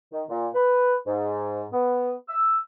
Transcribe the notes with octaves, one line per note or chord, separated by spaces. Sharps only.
D#3
A#2
B4
G#2
B3
E6